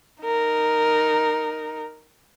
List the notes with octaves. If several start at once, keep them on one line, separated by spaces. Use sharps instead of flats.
D#4 A#4